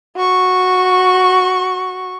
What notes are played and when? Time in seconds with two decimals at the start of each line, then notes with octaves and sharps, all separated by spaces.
0.16 F#4 C#6